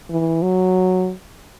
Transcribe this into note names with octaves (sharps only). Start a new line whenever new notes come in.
E3
F#3